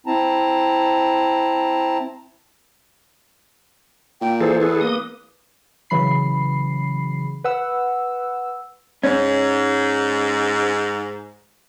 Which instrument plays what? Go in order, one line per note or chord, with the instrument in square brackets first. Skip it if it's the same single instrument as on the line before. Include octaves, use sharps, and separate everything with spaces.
[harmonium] C4 E4 A5 A#5
[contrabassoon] A#2 [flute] G5
[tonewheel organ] E3 G#4 A4 [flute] C5
[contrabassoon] E2 [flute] B4
[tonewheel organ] A#3 D#6
[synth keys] C#3 E3 F#3 B5 C7
B4 F#5 E6
[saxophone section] G#2 [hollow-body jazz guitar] C#4